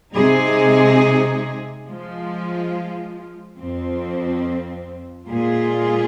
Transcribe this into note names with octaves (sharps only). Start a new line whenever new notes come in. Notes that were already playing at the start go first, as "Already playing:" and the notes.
C3 G#3 C4 D#4 G#4
F3 G#3 F4
F2 F3 C4
A#2 G#3 F4 G#4